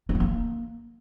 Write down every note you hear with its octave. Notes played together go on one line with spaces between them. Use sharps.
E4
A3
A#3